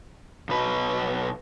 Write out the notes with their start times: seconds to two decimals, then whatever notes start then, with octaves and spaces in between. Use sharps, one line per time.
0.49 B1 B4